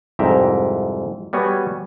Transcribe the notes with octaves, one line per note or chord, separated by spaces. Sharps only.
C2 F2 G#2 E5 G5 A#5
G3 B3 F#4 C#5 G#5